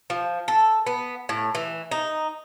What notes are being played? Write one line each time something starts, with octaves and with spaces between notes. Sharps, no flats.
F3
A4
B3
A2
E3
D#4